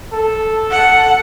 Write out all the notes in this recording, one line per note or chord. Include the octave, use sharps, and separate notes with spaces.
A4
F#5